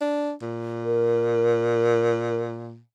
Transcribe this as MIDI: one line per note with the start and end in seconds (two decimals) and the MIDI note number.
0.01 0.32 62
0.42 2.80 46
0.84 2.42 70